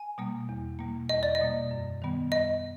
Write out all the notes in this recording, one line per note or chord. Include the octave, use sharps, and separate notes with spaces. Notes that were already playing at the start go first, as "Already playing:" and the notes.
Already playing: G#5
B2 G3 A#3
E2
B2 G3 A#3
E2 D#5
D5
D#5
B2 G3 A#3
F#2
D#3 G3 B3
F#2 D#5